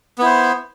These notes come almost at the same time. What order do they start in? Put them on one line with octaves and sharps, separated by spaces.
B3 E4 C5